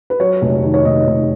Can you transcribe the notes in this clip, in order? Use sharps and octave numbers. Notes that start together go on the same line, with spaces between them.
B4
F#3 C#5
F1
D#3
C#5
F1 D#5
F1